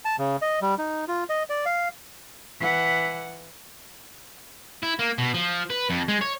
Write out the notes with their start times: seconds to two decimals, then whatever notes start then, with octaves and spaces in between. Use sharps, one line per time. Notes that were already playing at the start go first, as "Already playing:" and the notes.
0.05 A5
0.19 C#3
0.42 D#5
0.62 G3
0.78 D#4
1.08 F4
1.30 D#5
1.50 D5
1.66 F5
2.60 E3 F#5
4.83 E4
4.99 A#3
5.18 B2
5.34 F3
5.70 B4
5.90 F2
6.08 G#3
6.21 C#5